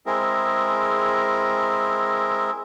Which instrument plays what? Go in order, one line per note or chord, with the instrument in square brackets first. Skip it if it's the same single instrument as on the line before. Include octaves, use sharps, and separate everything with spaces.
[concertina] G#3 C4 E4 G#4 A#4